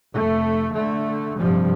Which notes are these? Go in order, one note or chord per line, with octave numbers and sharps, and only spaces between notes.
F1 A3
D3 A3
G2 C3 F3 G3